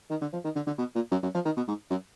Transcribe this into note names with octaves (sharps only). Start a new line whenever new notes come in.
D#3
D3
F3
D#3
D3
D3
B2
A#2
F#2
F#2
F3
D#3
B2
G#2
F#2